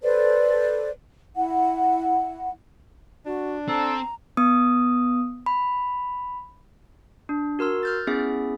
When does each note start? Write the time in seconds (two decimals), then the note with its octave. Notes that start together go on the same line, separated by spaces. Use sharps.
0.02 A4 B4 C5 D5
1.36 E4 F#5
3.26 D4 F#4
3.68 C4 A4 A#5
4.37 B3 D#6
5.46 B5
7.29 D4
7.59 F#4 A#4 C6 E6
7.83 F6 G6 A6
8.07 B3 C#4 E4 G#4 E5